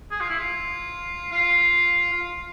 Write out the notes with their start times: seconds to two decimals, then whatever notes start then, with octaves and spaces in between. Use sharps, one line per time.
0.11 G#4
0.21 F4
0.29 E4
0.38 F4
1.32 F4
2.13 F4